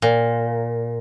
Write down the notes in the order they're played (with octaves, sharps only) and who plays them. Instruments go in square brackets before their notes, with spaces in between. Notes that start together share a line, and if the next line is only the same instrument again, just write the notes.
[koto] A#2